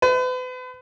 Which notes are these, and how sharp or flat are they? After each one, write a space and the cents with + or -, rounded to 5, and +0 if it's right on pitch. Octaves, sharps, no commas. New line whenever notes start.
B4 +40